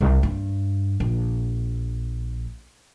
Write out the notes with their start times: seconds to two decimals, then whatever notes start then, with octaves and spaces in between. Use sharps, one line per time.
0.01 C2
0.23 G2
1.00 A#1